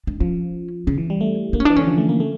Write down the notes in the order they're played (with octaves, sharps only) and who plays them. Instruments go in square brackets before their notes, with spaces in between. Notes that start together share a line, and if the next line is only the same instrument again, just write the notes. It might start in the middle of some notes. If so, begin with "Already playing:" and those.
[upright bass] D4
[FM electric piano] F3 [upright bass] C#4
[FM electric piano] C#3 [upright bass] C#4
[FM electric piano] E3
G3
A3
[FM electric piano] A#3 [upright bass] D4
[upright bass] C#4
[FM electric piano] E3 [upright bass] D4
[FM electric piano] D3 [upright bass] C#4
[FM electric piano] F3
A3
A#3
A3